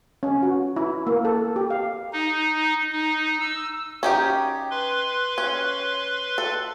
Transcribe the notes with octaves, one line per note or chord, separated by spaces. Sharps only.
C#4
F#4
E4
A#3
A4
G4
F5
D#4
D#4
E6
C#4 D#4 G4
B4 C6
C#4
A4